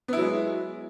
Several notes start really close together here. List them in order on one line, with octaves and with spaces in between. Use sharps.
B3 E4 F#3 G#3